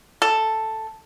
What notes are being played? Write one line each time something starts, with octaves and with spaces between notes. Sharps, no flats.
A4